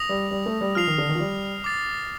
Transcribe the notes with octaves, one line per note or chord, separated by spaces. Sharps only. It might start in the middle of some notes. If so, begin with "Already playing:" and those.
Already playing: D#6 A#6 F7
G3
G3
A3
G3
F3 F6 C7 F7
D#3
D3
D#3
F3
G3
D6 A6 C7